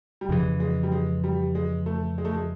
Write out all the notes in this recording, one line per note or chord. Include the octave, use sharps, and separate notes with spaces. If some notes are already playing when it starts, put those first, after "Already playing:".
G3
F2 C#3 E3 G#3
G#3
G3
G#3
G3
G#3
A3
G#3
A3
G#3